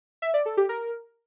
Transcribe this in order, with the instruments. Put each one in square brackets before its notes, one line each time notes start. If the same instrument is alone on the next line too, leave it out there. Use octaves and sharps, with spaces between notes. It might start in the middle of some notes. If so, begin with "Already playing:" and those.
[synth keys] E5
D5
A4
G4
A#4